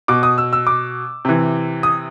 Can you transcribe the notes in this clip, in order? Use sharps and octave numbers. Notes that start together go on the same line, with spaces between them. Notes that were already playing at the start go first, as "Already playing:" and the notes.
B2 D6
D#6
E6
E6
D6
C3 E3
D#6